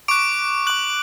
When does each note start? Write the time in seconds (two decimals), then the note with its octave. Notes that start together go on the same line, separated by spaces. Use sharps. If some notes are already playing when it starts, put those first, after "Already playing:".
0.08 C#6 D6 F#6 D7
0.67 C#6 F#6 F#7